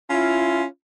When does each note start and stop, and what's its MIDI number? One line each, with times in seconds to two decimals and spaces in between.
0.10 0.63 61
0.10 0.63 64
0.10 0.63 65